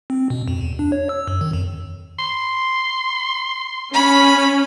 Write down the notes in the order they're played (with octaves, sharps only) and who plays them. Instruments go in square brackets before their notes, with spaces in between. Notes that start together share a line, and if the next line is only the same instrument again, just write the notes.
[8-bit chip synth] C4
B2
F2
E2
D4
C#5
E6
F#2
D#3
F2
[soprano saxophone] C6
[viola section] C#4 [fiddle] B5